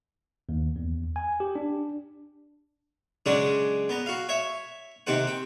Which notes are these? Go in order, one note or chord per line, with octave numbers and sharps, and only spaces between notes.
D#2
E2
G#5
G4
D4
C#3 F#3 G#3 C#4 D4
B3 A#5
F#4 F5
C#5 E5
C3 D#3 C4 C5 F#5
G5